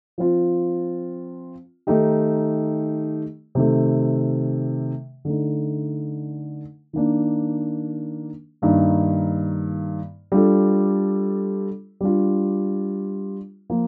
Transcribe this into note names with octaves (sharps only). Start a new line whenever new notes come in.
F3 C4 F4
D#3 A3 D#4 G4
C3 D#3 A3
D3 A3 D#4
D#3 A#3 D4
G2 D#3 A#3 D#4
G3 D4 F4 A4
G3 D4 F4
F3 A#3 F4